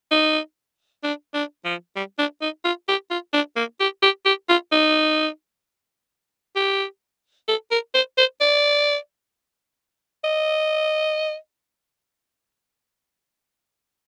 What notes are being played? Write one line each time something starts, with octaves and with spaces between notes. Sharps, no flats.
D#4
D4
D4
F3
G3
D4
D#4
F4
G4
F4
D4
A#3
G4
G4
G4
F4
D#4
G4
A4
A#4
C5
C5
D5
D#5